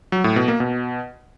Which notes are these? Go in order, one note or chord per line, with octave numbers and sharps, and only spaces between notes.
F#3
A2
B2
A#3
B2